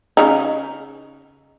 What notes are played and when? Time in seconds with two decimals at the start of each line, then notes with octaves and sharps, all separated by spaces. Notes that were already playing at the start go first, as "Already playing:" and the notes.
0.17 C#3 D#4